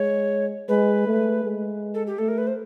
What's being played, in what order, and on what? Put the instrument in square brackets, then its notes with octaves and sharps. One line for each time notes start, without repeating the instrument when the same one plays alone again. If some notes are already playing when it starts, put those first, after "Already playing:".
Already playing: [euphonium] G#3 [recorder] C#5
[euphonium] G#3 [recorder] B4
[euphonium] A3
G#3
[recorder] A4
G4
[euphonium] A3 [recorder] A4
[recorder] A#4
B4
C5